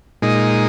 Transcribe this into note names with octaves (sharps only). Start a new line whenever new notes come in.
A#2 G#3 D#4